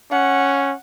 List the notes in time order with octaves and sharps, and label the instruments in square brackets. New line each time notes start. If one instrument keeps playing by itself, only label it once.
[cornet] C#4 [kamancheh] F#5